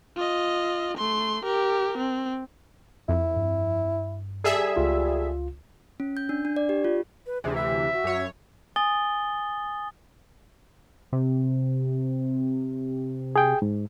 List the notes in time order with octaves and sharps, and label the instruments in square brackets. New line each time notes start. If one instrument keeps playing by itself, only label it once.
[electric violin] F4 D#5
A3 C6
G4 A#4
C4
[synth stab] F2 [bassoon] E4
[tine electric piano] G2
[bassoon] G3 [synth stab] G#4 A4 E5
[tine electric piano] C#2 F4
[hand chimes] C#4
G6
D4
D4
D5
G4
F4
[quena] B4
[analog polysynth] D2 C3 E3 [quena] G#4
[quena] G4 [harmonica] E5
[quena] F#4
[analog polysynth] F#2 C#5
[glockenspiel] G#5 D#6 A6 G7
[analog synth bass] C3
[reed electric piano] G#4 G5
G#2